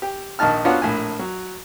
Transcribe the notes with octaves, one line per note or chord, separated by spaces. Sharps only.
G4
A#1 D#3 D#4 A5 F6
B3 C#4 D4 F4 F#4 F#5
A#1 A2 G#5
F#3